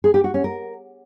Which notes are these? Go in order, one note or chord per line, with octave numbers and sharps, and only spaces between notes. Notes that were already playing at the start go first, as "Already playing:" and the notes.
G#4
G4
F#4
C#4
A#4